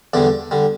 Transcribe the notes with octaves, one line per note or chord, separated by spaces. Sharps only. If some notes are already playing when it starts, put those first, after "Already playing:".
E2 D3 G3 D5
D3 G3